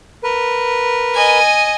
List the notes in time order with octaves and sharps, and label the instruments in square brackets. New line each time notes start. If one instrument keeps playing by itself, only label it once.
[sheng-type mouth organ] A#4 B4
[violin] D#5 G#5